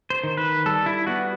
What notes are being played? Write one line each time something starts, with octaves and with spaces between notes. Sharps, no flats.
C5
D#3
B4
G3 A4
E4
B3 F#4